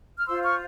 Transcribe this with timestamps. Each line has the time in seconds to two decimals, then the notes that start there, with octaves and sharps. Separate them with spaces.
0.17 F6
0.26 F4 C5 C6 E6
0.42 C#6 F6